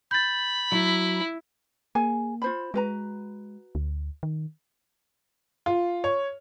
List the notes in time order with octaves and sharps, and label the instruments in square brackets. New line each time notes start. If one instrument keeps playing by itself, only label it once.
[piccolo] B5 [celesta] G6 A6
[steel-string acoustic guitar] F#3 [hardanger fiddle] E4
[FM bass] A#3 [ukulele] G#4 G#5
[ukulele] F4 C5 B5
[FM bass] G#3 [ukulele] F#4 B4 A#5
[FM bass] D2
D#3
[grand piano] F4
C#5